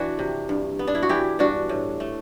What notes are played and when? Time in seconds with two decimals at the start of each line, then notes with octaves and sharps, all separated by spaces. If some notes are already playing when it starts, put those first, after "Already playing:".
Already playing: E3 D4 F#4
0.19 C3
0.49 G2
0.79 B3
0.87 D4
0.95 E4
1.02 F#4
1.09 E3 E4 G4
1.39 G2 D4 F#4
1.69 A2
2.00 A3